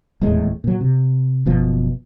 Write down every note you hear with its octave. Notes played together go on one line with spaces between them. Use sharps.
D#1 E2 A2 G#3
A#2 F#3
C3
F#1 B2 F3